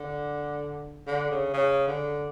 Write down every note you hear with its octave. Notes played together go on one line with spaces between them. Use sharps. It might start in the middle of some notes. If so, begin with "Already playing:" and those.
Already playing: D3
D3
C#3
C#3
D3